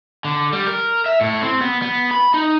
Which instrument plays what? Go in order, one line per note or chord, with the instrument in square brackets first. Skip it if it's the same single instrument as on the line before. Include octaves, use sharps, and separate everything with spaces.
[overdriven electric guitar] D3
G3
A#4
E5
A2
C4
B3
B3
B5
D#4